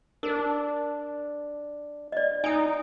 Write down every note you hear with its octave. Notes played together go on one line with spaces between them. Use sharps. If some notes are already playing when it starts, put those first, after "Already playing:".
D4 A#4
D5 D#5
D#4 G#5 D#6